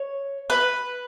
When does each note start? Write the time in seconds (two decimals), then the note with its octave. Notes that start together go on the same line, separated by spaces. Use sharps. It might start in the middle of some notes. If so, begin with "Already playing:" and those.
Already playing: C#5
0.50 B4